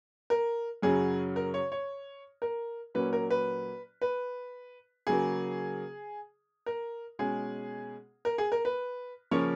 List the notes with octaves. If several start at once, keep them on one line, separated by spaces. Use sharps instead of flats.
A#4
F#2 C#3 F#3 C#4 G#4
A#4
C#5
C#5
A#4
A#2 F#3 A#3 C#4 B4
A#4
B4
B4
C#3 F#3 A#3 G#4
A#4
B2 G#3 C#4 G#4
A#4
G#4
A#4
B4
C#3 F3 A#3 C#4 C#5